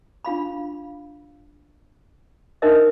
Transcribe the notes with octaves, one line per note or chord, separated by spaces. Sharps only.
D4 F4 F5 B5
D4 D#4 A#4 C5 D#5 E5